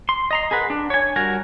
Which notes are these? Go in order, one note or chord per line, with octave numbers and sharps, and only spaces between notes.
C6
D#5 A#5 C6
G#4 A#4 B4 F#5
D4
C#5 G#5
G3 F#4 A#4 G#5 A#5